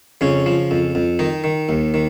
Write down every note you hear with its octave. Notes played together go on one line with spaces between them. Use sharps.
F2 C#3 C#4
F3
F2
F2
D#3 D#4
D#3
D#2
D#3